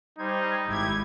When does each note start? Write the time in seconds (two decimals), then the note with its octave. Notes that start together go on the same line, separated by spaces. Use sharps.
0.19 G3 D#4 C5 G#6
0.68 G#1 E4 G4 G#6